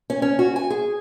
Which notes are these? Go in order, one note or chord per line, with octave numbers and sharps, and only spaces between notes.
C#4
C#4
F#4
G#5
G#4